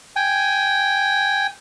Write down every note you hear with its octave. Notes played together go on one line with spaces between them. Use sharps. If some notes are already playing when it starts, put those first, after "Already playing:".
G5 G#5